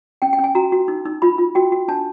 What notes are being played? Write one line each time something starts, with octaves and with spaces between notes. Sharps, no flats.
C#4 G5
G5
C#4 G#5
F#4 A#5
F#4
D#4
D#4
F4 B5
F4
F#4 G5
F#4
D4 A5